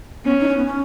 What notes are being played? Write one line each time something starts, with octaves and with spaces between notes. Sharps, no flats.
B3 C#4
D#4
C#4
B3
C#4